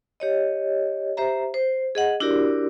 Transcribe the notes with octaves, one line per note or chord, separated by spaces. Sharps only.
G4 C#5 D#5
G4 C5 E5 A#5
C5
G#4 D#5 F#5
D4 E4 F#4 G4 A#4 D5